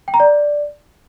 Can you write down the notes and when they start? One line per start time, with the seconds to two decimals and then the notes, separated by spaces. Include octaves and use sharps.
0.08 G5
0.14 A#5
0.20 D5